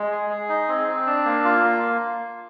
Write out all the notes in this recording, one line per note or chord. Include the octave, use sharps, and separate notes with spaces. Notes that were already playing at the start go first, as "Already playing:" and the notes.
Already playing: G#3
G#4
G#4
D#4
C4
C4
D4
A#3
F4
A#3